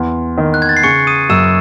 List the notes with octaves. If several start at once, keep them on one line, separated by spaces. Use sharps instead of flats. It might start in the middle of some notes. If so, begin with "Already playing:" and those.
Already playing: E2 C6
D#3
F#6
G#6
A6
C7
C#3 C#6 C#7
D#6 D#7
F#2 E6 E7